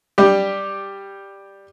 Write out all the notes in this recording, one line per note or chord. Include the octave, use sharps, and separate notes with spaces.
G3 G4